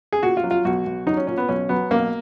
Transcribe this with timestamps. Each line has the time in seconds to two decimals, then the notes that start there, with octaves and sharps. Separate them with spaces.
0.12 G#4
0.23 A#2 F#4
0.37 F4
0.44 F#3
0.51 F4
0.65 B1 F#4
0.86 B1
1.07 F#3 D#4
1.17 C#4
1.27 A#2 C#4
1.37 B3
1.49 B1 C#4
1.69 F#3 B3
1.90 B1 A#3